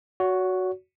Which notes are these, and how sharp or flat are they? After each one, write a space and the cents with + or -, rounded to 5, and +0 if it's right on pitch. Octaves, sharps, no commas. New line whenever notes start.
F#4 +0 C#5 +40